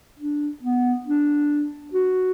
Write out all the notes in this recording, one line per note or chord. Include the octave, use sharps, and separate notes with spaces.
D4
B3
D4
F#4